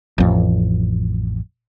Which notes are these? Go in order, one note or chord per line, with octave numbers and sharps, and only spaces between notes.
A1 F2